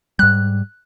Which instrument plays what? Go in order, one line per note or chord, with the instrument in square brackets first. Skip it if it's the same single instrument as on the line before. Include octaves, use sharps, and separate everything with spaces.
[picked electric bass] G#2 G3 [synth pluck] F#6